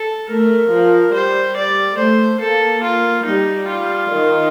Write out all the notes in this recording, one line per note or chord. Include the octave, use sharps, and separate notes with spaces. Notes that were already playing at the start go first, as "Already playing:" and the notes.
Already playing: A4
A3 A#4
F3
G3 C5
D5
A3 C5
A#3 A4
F4
G3 D#4
F4
D#3